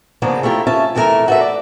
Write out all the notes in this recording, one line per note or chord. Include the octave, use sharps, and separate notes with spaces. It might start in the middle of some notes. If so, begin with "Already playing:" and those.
C#3 F3 G#3 A#3 B3 D4
A3 E4 F4 G4 A#4
C#4 F4 E5 A5
F2 E3 A3 D4 A#4 E5
F#4 A4 B4 D#5 E5
D5